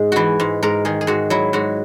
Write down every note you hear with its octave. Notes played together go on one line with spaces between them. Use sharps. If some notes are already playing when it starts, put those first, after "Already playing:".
Already playing: G#2 G#4
E3 E4 F#4
G#2
G#2 A#4
D#3 G#4
G#4
G#2 F#4
F#3 E4
G#2 F#4